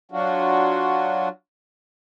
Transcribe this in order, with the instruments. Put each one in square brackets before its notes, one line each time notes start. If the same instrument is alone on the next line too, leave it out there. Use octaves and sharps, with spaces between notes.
[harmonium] F#3 D4 F4 F#4